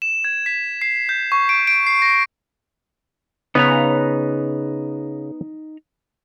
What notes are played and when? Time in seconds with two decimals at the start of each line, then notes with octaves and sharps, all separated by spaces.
0.02 E7
0.24 G#6
0.46 B6
0.82 C7
1.09 G6
1.32 C#6
1.49 D7
1.67 D7
1.87 C7
2.02 A#6
3.55 C#3 B3 D#4 B4 C#5 A#5